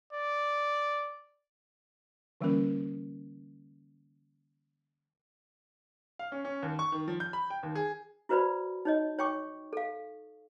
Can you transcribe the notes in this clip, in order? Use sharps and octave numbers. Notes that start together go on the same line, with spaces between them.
D5
D3 E3 G3 A#3 C#4 A#4
F5
C#4
C#4
D#2
C#6
D#3
F3
G6
B5
G5
D#2
G#4
E4 F#4 B4 C5 D5 B5
D#4 C#5 D#5
C#5 G5 C#6 D6
A4 F5